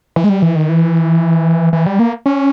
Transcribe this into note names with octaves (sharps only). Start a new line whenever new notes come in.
E3
G#3
G3
E3
D#3
E3
E3
G3
A#3
C#4